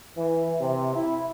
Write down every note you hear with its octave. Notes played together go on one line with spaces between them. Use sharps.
E3
C3
E4